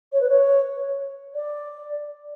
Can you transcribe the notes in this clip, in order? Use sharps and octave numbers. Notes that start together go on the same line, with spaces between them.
C#5
B4
C#5
D5